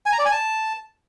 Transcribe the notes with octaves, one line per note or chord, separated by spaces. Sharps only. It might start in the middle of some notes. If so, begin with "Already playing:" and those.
G#5
A#5
D5
G#5
A5